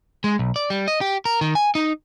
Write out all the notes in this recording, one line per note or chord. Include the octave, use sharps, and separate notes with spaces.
G#3
B1
D5
G3
D#5
G4
A#4
D#3
G#5
D#4